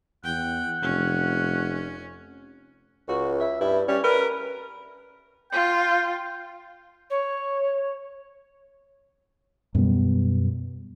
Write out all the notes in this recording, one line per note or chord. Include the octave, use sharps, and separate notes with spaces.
E2 F#5 G5
F1 C#4
C#2 F#4
E5
G2 E4
G3 C#4
A#4 B4
F4 G5
C#5
F#2 B2 G3 B3